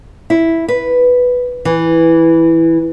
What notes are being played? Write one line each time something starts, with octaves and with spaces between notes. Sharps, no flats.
E4
B4
E3